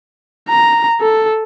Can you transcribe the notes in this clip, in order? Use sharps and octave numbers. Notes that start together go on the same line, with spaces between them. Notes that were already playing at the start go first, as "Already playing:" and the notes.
A#5
A4